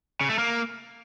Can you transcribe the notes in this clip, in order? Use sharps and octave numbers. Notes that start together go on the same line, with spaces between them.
C#3
A3
A#3